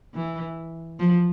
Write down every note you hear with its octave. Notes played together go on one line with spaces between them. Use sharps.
E3
F3